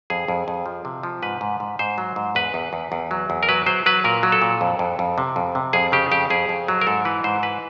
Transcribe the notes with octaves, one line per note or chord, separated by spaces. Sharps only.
F2 G#4
F2
F2
F3
C3
F3
G#2 B4
G#2
G#2
G#2 C5
F#3
G#2
E2 B4
E2
E2
E2
F#3
E2
A#4
F#3 B4
F#3 C5
F#3 B4
A#2 A#4
F#3
A4
A#2
F2
F2
F2
C3
F2
C3
F2 G#4
C#3 G4
F2 G4
F2 G#4
F2
F#3
A#4
G#2 A4
E3 B4
G#2 C5
E3 B4